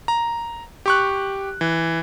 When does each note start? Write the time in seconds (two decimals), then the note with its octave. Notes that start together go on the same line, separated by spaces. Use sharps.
0.08 A#5
0.86 G4 C#6 F#6
1.61 E3